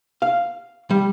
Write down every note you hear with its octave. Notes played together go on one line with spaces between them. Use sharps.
F5
G3